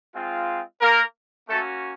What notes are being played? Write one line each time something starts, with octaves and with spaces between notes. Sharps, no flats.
G#3 C4 F4
A#3 A#4
A3 A#3 C#4 F#4 A4